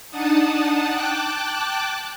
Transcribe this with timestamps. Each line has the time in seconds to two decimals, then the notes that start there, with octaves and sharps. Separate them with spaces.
0.10 D4 D#4 D#5 F#5 A5
0.89 G5 A5 D6 F#6